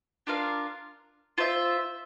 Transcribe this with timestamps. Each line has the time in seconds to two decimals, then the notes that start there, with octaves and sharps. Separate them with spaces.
0.27 D4 F4 A#4 F5
1.38 F4 C5 E5